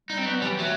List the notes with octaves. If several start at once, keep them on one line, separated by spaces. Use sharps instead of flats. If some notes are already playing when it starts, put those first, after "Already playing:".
G3 D#4
C4
F#3 B3
E3 G3
F#3 A3